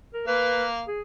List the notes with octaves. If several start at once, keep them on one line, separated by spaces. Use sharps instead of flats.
A#4
A#3 B4 F5
G#4